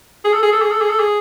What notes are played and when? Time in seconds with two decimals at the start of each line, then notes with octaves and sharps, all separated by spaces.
0.25 G#4
0.34 A4
0.43 G#4
0.52 A4
0.62 G#4
0.72 A4
0.81 G#4
0.90 A4
0.99 G#4